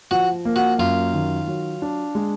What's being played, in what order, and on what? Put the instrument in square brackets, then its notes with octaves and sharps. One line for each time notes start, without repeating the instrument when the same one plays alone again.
[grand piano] F3 [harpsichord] F#4
[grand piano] A#3
[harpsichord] F#4
[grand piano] F#2 [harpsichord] F4
[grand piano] D#3
F#3
D4
G#3